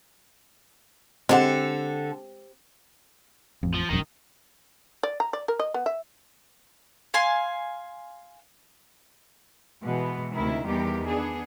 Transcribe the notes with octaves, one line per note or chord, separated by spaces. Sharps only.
D3 G#3 C4 G4 A4 F#5
A1 F2
F3
E1 A#1 F#2 D#3 D#4
D5
A#5
D5
A#4
D#5
B3
E5
F5 G#5 C6
B2 E3 G#3 B3
D2 C3 D#3 E4
E2 D#3 G3 B3 G4
B3 D4 G#4